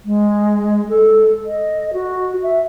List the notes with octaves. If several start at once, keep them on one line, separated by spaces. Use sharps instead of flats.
G#3
A4
D#5
F#4
E5